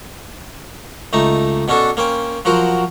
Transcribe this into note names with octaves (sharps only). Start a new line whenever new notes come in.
C#2 A3 D#4 A#5
B2 C#4 D4 F#4 A4
A#3 C#4 C5 G5
F3 F#3 F#4 A#4 C5